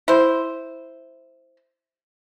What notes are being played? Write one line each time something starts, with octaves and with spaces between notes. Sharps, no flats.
E4 C5